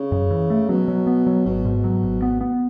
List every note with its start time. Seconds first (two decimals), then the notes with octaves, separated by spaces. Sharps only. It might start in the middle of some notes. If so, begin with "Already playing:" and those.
Already playing: C#3
0.12 F#2
0.31 E3
0.50 A3
0.69 B2 F#3
0.88 F#3
1.07 B3
1.27 F#3
1.46 G#1 B2
1.65 G#2
1.84 F#3
2.03 G#1
2.22 B3
2.41 B3